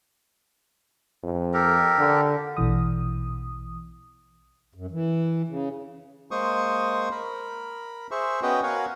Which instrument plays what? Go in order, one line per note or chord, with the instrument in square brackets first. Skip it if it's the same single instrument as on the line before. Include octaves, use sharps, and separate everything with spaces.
[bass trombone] F2
[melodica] G4 A4 A#4
[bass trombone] D3
[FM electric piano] A#1 B2 E3 D#6
[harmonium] F#2
E3
C#3
[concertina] G#3 A#3 C5 C#6 D#6
A#4 B5
G#4 C5 E5 C#6
B3 C#4 F#4 B4 D#5 G5
F#4 A#4 C#5 F5 F#5 G#5